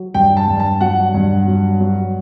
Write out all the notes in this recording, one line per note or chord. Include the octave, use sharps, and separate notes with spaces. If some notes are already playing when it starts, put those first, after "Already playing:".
Already playing: F#3
G2 G5
A5
G2
A5
F#3 F#5
G2
F#3
F#3